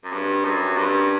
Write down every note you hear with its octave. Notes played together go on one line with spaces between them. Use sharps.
F#2
G2
F#2
G2